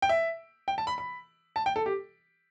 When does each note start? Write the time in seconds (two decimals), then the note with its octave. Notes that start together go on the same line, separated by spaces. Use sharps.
0.02 G5
0.09 E5
0.68 G5
0.78 A5
0.87 B5
0.98 B5
1.56 A5
1.66 G5
1.76 A4
1.86 G4